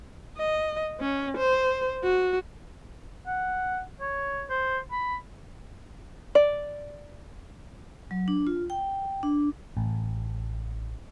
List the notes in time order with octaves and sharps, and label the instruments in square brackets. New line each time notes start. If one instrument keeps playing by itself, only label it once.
[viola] D#5
C#4
C5
F#4
[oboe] F#5
C#5
C5
B5
[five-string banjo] D5
[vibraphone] F#3
D4
F4
G5
D4
[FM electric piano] A1